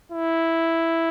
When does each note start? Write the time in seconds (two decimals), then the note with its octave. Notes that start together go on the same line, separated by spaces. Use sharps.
0.12 E4